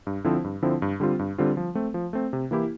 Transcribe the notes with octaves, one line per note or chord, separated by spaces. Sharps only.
G2
D3 F3 C4 E4
G2
D3 F3 C4 E4
G2
D3 G3 C4 F4
G2
D3 G3 C4 F4
F3
A3 C4
F3
A3 C4
C3
E3 A#3 E4 G4